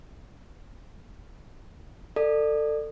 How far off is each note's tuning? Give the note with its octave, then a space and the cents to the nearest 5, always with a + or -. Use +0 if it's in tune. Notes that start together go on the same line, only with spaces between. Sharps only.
A4 +25 D5 +25